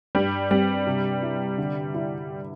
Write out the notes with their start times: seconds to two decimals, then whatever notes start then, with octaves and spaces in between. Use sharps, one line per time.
0.15 G2 G3
0.51 G3 C4
0.87 C3
1.22 E4
1.58 D3
1.94 E4